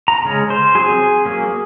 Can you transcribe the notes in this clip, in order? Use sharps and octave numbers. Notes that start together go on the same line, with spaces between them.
A#5
C#3 G#3 C#4
C5
F#3 C4 G#4
F#3 A#3 C#4